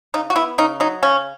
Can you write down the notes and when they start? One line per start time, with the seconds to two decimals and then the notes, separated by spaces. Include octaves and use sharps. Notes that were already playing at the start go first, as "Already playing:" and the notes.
0.14 C#3 D#4
0.30 F#4
0.36 B3 E4
0.58 C#3 D#4
0.80 F#3 D#4
1.03 C#3 C#4